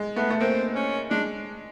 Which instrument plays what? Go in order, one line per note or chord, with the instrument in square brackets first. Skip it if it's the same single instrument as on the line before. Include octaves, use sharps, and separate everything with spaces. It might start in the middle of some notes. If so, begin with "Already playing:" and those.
Already playing: [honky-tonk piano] G#3
[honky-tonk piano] A3 [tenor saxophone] B3
[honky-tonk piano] A3
[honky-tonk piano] A#3 [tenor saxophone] C4
[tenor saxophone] C#4
[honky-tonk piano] G#3 [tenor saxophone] D4